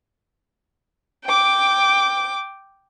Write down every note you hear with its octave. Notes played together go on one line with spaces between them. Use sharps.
G5 D6